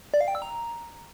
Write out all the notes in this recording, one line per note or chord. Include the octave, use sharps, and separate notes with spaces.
D5
F5
G5
E6
A#5